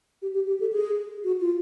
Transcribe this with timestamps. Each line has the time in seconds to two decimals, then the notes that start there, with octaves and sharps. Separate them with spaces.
0.22 G4
0.35 G4
0.47 G4
0.60 A4
0.73 G#4
1.24 F#4
1.40 F4